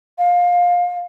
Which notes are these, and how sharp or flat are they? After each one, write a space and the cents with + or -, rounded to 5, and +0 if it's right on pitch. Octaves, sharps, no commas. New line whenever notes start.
F5 +20